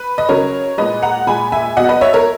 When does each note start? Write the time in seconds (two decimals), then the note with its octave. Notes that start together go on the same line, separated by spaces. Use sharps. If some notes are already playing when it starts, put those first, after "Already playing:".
Already playing: B4
0.18 D#5
0.29 C#3 F#3 A#4 C#5
0.78 A#2 G#3 B4 D#5
1.02 F#5 A#5
1.27 A#2 G#3 G#5 B5
1.52 E5 G#5
1.77 B2 D#5 F#5
1.80 F#3
1.89 B4 D#5
2.01 C#5 E5
2.13 A#4 C#5